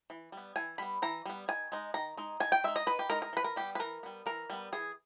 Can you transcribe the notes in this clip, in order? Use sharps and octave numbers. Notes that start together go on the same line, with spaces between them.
E3
G3 B3
E3 G#5
G3 B3 B5
E3 A#5
G3 B3
D#3 G#5
G#3 D#4
D#3 A#5
G#3 D#4
D#3 G#5
G5
G#3 D#4 E5
D#5
D#3 B4
G4
G#3 D#4 A#4
A#4
E3 B4
A#4
G3 B3 G4
B4
E3 A#4
G3 B3
E3 A#4
G3 B3
E3 G#4